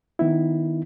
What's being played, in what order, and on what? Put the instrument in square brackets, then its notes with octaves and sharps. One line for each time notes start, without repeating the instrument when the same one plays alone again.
[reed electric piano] D#3 B3 D#4 E4